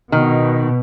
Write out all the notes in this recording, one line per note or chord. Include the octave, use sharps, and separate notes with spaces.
B2 D#3